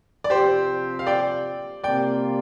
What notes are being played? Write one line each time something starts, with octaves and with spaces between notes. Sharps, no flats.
D5
C3 F3 C4 G4 C5
F5
D5 G5
C3 G3 A#3 F4 D5 G5